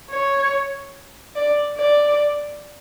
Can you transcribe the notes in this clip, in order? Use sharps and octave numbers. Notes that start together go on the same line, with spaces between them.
C#5
D5
D5